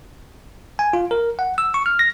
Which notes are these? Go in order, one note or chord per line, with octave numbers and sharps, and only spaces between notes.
G#5
F4
A#4
F#5
E6
C#6
F6
A#6